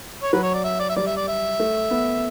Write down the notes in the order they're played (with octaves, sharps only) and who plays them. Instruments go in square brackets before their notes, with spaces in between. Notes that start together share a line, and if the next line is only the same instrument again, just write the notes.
[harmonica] C#5
[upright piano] F#3 [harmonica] B4
[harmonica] C#5
D5
E5
D5
E5
[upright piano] G3 [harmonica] D5
[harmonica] E5
D5
E5
[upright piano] A3
B3